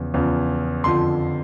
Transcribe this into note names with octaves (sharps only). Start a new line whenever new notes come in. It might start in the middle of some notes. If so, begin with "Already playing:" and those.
Already playing: E2 C#3 F3
E2 C#3 F3
F2 D3 F3 C6